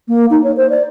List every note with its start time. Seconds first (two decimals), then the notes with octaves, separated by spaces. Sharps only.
0.08 A#3
0.30 D#4
0.43 C#5
0.57 C5
0.69 D5